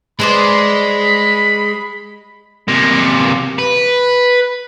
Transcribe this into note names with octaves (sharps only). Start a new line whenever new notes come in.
G#3 B4 C5 D5 B5
C3 A#3
B4